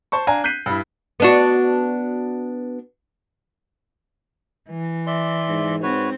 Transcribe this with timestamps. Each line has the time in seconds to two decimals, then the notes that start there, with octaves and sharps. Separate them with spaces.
0.12 C5 A5 C#6
0.27 D4 F5 G#5 A#5
0.44 F#6 G6 B6 C7 D#7
0.66 G2 E4
1.20 B3 D4 F#4
4.70 E3
5.07 D5 E5 C6
5.49 G#2
5.83 C4 F#4 B4 C#5